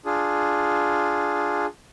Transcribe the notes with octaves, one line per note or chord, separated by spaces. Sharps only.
D4 F4 G#4